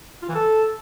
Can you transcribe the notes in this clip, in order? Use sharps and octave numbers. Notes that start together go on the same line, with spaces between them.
F4
E3
A4